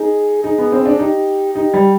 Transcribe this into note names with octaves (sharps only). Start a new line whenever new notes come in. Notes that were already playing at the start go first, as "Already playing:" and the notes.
Already playing: D#4 G#4
D#4 G#4
B3
C4
D4
D#4 G4
D#4 G4
G3